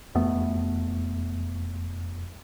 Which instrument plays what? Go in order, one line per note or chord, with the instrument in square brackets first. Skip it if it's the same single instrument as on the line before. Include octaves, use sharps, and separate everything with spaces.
[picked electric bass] E1 F2 A3 B3